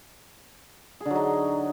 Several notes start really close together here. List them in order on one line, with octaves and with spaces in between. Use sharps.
G#4 D3 F#3 D#4